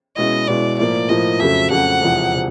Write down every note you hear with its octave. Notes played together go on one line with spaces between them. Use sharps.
B2 G#3 C#4 E4 D#5
B2 G#3 C#4 E4 D5
A2 F3 A#3 D5
A2 F3 A#3 D#5
F2 C#3 F#3 A3 E5
F2 C#3 F#3 A3 F#5
E1 E2 C3 F3
C3